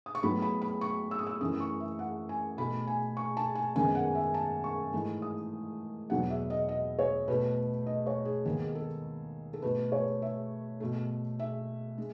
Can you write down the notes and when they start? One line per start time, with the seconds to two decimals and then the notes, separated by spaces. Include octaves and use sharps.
0.06 D#6
0.15 C#6
0.22 A2 F#3 B3 B5
0.42 B5
0.62 B5
0.81 C#6
1.11 E6
1.19 D#6
1.27 E6
1.41 F#2 E3 A3 D#6
1.60 C#6
1.80 E5
1.99 F#5
2.29 G#5
2.57 B2 A3 B5
2.87 G#5
3.17 C#6
3.37 A5
3.55 G#5
3.75 F#2 D#3 G#3 B3 G#5
3.95 F#5
4.15 E5
4.34 A5
4.64 C#6
4.93 G#2 E3 A3
5.22 D#6
6.10 E2 B2 F#3 B3 F#5
6.30 E5
6.50 D#5
6.69 D#5
6.99 C#5
7.28 B2 A3 B4
7.86 D#5
8.06 C#5
8.25 G#4
8.45 D#2 D#3 G#3 B3 G#4
8.75 A4
9.54 A4
9.62 B2 A3 B4
9.92 C#5
10.22 E5
10.80 B2 A3
11.40 E5
11.98 G#3